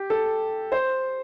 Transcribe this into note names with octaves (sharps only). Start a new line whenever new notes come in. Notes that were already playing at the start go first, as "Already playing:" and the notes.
Already playing: G4
A4
C5